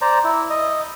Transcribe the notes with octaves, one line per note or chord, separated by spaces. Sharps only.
C5 D5 A#5
E4
D#5